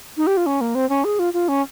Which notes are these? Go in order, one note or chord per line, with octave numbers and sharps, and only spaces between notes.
D#4
G4
F4
C#4
A#3
C4
C#4
G#4
F4
F4
C#4